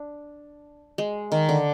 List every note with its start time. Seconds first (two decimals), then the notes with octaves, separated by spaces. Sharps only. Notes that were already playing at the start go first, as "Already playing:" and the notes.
Already playing: D4
0.98 G#3
1.32 D#3
1.49 D3